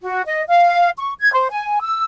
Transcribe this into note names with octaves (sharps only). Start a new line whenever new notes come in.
F#4
D#5
F5
C#6
G#6
C5
G#5
E6